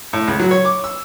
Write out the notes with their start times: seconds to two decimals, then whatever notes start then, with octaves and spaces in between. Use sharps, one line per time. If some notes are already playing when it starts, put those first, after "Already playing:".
0.13 A2
0.28 C#2
0.40 F#3
0.51 C#5
0.65 D6
0.84 E6